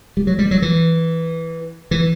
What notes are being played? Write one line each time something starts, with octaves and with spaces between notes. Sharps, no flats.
G3
F#3
G3
F#3
E3
E3